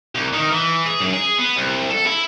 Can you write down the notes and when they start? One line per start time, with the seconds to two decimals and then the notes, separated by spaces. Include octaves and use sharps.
0.15 C2
0.34 D#3
0.52 E3
0.86 G#4
1.01 F#2
1.14 G#4
1.38 B3
1.56 C2
1.91 A4
2.07 E4